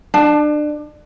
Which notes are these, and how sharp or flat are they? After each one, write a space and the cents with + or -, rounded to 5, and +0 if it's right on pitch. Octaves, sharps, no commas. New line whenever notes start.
D4 +30 A5 +0